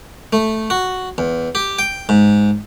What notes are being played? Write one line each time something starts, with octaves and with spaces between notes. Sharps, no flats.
A3
F#4
E2
G4
G5
G#2